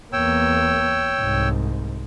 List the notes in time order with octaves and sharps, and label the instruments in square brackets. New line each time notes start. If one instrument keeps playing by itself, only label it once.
[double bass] E2 A#3 [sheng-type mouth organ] C#5 G5 E6
[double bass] C2 G#2